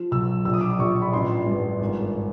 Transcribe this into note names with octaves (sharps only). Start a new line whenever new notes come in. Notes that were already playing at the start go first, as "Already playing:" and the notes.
Already playing: F3
B1 E6
A#1 E6
D#6
D6
D#6
A#1 C#6
B5
A1 C6
G2
G#1